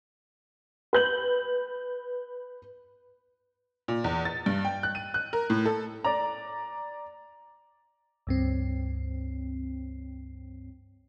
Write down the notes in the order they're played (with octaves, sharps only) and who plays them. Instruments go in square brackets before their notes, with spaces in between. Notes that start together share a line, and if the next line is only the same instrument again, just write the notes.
[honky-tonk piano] B4 G6 F#7
A#2
E2
A6
G2
G5
F#6
D#7
F#6
A#4
A2
A4
D5 A#5
[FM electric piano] C#2 G2 C4